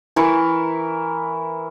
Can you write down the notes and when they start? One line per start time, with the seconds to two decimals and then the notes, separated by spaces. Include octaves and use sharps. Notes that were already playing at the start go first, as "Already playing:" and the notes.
0.16 E3 E4 A#4 C#6